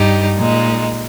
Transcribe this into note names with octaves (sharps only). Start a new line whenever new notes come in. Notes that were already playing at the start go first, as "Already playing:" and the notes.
Already playing: G2 G3 D#4 G4
A#2 G#3 D#4